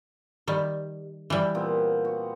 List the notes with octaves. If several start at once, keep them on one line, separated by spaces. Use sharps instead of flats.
D#3 G3
E3 G3
A#2 B3 C4
F#4